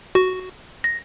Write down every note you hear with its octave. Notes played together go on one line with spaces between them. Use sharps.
F#4
A#6